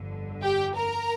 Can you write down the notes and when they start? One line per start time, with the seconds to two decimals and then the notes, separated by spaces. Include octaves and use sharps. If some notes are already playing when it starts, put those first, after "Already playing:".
Already playing: G1 F2 D3
0.43 G4 G5
0.76 A#4 A#5